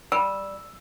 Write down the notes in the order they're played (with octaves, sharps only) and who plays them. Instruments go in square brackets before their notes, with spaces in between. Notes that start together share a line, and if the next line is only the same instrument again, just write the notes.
[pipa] G3 [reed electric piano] E6